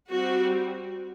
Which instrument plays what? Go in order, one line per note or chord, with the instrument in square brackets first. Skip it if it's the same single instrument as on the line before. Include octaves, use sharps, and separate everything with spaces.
[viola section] G3 C4 F#4